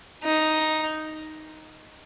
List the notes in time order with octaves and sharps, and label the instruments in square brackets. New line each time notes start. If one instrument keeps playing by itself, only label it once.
[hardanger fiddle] D#4